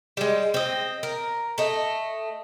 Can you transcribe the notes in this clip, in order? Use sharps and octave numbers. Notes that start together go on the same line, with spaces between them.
G3 G#3
C4 D#5
A#4
A3 D#5